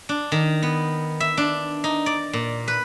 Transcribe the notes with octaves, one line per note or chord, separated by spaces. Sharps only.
D4
D#3
B3
E5
D4
D#4
D5
A#2
B4